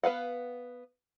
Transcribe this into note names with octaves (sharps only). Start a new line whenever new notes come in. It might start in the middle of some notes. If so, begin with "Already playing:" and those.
B3 B4 F5 F#5